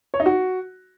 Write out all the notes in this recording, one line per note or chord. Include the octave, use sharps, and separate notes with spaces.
C#5
D#4
F#4